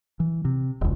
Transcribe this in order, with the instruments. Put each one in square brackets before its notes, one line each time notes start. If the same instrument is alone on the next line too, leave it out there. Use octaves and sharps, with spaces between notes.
[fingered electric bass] E3
C3
E1 C#2